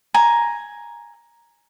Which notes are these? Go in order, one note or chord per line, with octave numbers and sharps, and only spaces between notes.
G#5 A#5